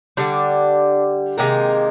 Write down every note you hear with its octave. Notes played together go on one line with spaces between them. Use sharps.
D3 G3 D4
C3 D#3 G#3 A#3